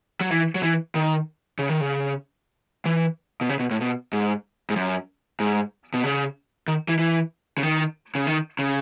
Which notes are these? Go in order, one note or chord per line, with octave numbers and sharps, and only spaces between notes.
F#3
E3
F#3
E3
D#3
C#3
D#3
C#3
E3
B2
C#3
B2
A2
B2
G#2
G#2
F#2
G#2
B2
C#3
D#3
E3
E3
C#3
D#3
C#3
D#3
C#3